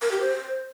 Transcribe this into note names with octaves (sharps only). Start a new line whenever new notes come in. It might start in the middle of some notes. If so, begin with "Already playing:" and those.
A#4
G4
C5